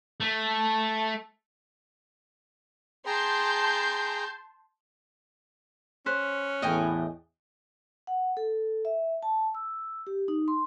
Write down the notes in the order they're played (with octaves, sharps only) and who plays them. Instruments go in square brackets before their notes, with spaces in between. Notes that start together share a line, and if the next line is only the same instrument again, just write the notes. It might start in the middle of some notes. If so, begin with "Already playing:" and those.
[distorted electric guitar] A3
[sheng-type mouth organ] G#4 G5 A#5 [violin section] A5 C6 G6
[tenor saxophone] C#4 [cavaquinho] C5 [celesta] F#6 B6
[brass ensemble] E2 A2 [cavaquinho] D#5 G5 G#5
[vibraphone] F#5
A4
E5
A5
E6
G4
D#4
C6